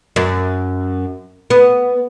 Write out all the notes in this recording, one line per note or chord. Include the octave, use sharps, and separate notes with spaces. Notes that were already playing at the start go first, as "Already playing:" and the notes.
F#2
B3